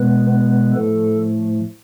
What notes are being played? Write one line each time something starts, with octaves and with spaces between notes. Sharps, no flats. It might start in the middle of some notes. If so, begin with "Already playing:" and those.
Already playing: B2 G#3 B3 B4
B3 B4
A2 F3 A3 A4